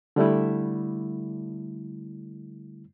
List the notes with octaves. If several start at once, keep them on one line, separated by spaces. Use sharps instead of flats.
D3 G3 A3 E4